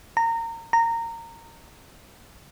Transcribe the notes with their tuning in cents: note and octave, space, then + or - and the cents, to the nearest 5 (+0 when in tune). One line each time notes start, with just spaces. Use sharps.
A#5 -25
A#5 -20